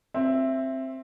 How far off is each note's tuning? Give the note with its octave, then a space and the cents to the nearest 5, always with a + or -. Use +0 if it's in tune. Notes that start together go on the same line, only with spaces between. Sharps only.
C4 +10 E5 +10